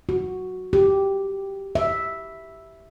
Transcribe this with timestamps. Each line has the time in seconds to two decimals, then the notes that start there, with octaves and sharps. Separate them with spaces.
0.09 F#4
0.73 G4
1.75 E5